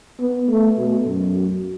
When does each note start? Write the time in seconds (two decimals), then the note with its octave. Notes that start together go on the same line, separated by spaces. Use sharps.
0.20 B3
0.49 A3
0.78 B2
1.06 F#2